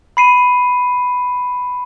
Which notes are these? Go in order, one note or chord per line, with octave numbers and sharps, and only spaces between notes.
B5 C7 D#7